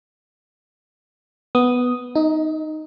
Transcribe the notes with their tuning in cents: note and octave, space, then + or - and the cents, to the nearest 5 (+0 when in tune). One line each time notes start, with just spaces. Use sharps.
B3 +0 F#5 +0 D#6 +0
D#4 +0 D#5 +35